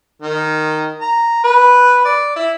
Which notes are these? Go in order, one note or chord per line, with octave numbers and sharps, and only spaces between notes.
D#3
A#5
B4
D5
E4